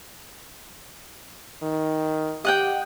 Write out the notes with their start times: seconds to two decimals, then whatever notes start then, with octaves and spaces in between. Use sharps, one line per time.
1.63 D#3
2.45 G4 D#5 F#5 G5